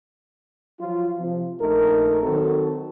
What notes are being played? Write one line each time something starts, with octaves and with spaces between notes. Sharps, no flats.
F3 F#3 F4
C3 F3
A#1 A3 D#4 A#4
D#3 F#3 C4 F#4 A4